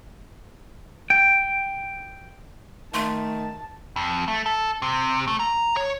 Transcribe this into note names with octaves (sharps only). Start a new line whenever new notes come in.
G5
D#3 A3 A5 C6
F2
A3
A4
C3
A3
A#5
C#5